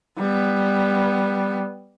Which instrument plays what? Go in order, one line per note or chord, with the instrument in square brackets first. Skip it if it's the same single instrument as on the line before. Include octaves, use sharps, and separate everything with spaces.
[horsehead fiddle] G3 B3